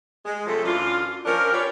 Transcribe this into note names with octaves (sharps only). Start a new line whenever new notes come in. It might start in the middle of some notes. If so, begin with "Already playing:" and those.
G#3
C3 F3 F#3 A3 A4
F#2 E3 D4 F4
F3 C#4 D4 A#4
C#4 F4 G4 B4 C#5 D5